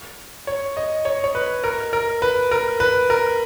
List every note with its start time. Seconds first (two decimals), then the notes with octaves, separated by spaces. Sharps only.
0.47 C#5
0.77 D#5
1.05 C#5
1.24 C#5
1.35 B4
1.64 A#4
1.93 A#4
2.22 B4
2.51 A#4
2.80 B4
3.10 A#4